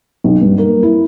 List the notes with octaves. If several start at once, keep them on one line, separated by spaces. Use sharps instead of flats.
B1
G2
A#3
E4